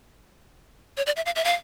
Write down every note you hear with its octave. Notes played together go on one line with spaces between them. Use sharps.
C#5
D5
E5
F5
E5
F5